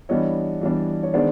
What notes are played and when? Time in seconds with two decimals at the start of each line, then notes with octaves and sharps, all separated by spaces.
0.09 E3 G3 B3 D4 C#5 D#5
0.61 E3 G3 B3 D4
1.03 C#5
1.14 D#3 G#3 B3 D4 C5 D5